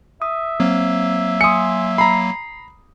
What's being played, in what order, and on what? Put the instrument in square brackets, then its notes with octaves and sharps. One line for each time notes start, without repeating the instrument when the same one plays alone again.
[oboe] E5 [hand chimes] D#6
[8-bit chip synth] F#3 A#3 [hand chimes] C4
[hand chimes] G#5 C6 [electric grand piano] D#6 C#7
[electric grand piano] A#5 B5 [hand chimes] C7